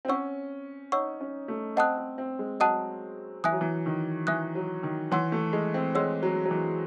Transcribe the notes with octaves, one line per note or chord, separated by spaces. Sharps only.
C4
C#4 C#5 F#5 C#6 E6
D#4 C#5 F#5 C#6 E6
C#4
A3
C4 D#5 F#5 A5 D#6 F#6
C4
C4
G#3
F#3 D#5 F#5 A5 D#6 F#6
E3 E5 G#5 D#6 F#6
F#3
E3
D#3
E3 E5 G#5 D#6 F#6
F#3
D#3
E3 C#5 F#5 C6 E6
A3
G#3
C4
G#3 C#5 F#5 C6 E6
F#3
F#3
E3